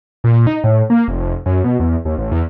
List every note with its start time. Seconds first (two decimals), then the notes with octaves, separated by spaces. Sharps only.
0.24 A#2
0.47 D#4
0.64 A2
0.90 A#3
1.08 F1
1.46 F#2
1.64 B2
1.80 E2
2.05 D#2
2.18 A1
2.32 E2